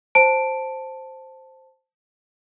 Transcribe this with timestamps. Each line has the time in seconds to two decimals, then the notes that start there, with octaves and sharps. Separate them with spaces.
0.15 C5 A5 D7